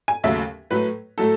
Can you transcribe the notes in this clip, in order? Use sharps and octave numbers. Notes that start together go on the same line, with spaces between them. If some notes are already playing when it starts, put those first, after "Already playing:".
G#5
D#2 C#3 F#3 A3 E5
A2 F#3 A3 B4
A2 F#3 A3 A4